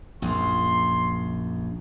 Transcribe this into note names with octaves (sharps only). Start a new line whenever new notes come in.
A#1 F#2 C6